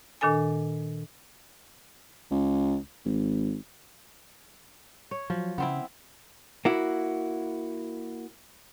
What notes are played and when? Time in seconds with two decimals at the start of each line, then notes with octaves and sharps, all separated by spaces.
0.21 A#2 D#3 D4 A4 G#5
2.31 C#2
3.05 G#1
5.11 C#5
5.30 F3 F#3
5.58 C#3 B3 C4 E4
6.65 A#3 E4 F#4